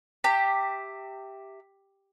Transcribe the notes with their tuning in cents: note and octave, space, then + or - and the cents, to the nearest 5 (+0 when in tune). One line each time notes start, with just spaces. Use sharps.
G4 +0 E5 +0 A#5 -45